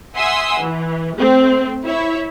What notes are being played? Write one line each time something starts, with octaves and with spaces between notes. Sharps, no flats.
E5 F#5 G#5 C6 D#6 E6
E3
A3 C4
E4 C#5 E5